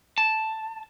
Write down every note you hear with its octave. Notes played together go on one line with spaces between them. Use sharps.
A5